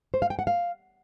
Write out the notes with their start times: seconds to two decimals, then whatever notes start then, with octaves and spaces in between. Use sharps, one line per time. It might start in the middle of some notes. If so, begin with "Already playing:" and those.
0.14 C5
0.22 F5
0.30 G5
0.39 F#5
0.47 F5